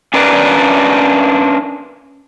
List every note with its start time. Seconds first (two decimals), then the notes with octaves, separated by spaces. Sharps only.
0.14 C#4 D4 A#4 B4 C#5 D5